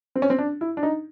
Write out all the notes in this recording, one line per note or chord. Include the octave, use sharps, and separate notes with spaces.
C4
C#4
C4
D4
E4
D4
D#4